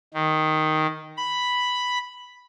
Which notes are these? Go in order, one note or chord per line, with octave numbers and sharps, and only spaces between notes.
D#3
B5